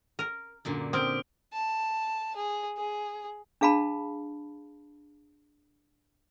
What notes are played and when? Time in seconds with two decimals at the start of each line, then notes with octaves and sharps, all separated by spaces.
0.19 A#4
0.65 F#2 A#2 D3
0.93 C4 G4 D#6 F6 D7
1.53 A5
2.36 G#4
2.77 G#4
3.61 D4 G#4 F5 A5 B5